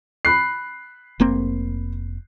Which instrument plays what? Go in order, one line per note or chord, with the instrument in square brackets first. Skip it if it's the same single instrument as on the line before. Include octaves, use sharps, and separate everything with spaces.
[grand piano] B5 F#6 C7
[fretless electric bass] F1 A#3 C4